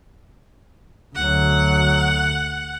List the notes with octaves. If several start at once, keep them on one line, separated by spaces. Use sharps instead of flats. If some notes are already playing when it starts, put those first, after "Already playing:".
D2 F#3 F#5